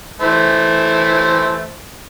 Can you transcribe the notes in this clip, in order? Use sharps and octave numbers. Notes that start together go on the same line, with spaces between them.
E3 A3 C5